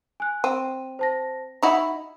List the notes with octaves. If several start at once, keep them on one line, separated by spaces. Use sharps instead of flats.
G#5 F#6
C4 D#7
C5 A5 A#6
D#4 E4 F#4 D#5